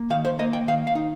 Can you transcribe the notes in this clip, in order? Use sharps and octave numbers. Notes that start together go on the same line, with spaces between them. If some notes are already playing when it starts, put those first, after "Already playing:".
Already playing: A#3
D#3 F5
C5
A#3 D#5
G5
D#3 F5
F5
D#4